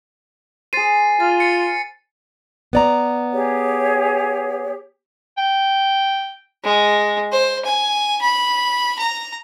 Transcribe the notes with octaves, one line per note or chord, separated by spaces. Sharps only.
G#4 C5 A6 C7 D#7
F4 A6
A6 C#7
B3 D5 A#5
G4 G#4 C#5
G5
G#3
C5
G#5
B5
A#5